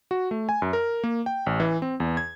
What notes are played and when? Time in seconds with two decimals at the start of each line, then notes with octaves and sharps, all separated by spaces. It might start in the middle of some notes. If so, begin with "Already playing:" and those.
0.11 F#4
0.31 A3
0.49 G#5
0.62 F#2
0.73 A#4
1.04 A#3
1.26 G5
1.46 A1
1.60 E3
1.82 C4
2.00 E2
2.17 G#6